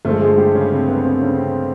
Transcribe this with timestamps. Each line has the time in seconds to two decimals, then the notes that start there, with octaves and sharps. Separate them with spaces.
0.05 G2 D3 F3 G#3 A3 A4
0.21 G#3 G#4
0.38 G3 G4
0.55 C#3 C#4
0.72 C4
0.89 B3
1.04 C4
1.21 C#3 C#4
1.38 C4